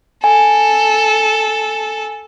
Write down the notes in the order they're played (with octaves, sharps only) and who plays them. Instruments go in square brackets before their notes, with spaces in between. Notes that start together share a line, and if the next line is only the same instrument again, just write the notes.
[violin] A4 [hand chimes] G#5